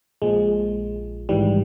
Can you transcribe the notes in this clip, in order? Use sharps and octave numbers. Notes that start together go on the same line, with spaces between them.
A#1 A#2 F3 G#3
G#1 G#2 E3 G3